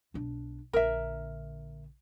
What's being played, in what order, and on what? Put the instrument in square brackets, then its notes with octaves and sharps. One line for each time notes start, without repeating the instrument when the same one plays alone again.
[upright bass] B1 D4
[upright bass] A#1 D3 [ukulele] A#4 E5